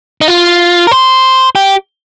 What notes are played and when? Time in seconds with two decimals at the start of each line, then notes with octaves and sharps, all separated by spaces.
0.21 D#4
0.28 F4
0.87 A#4
0.91 C5
1.55 G4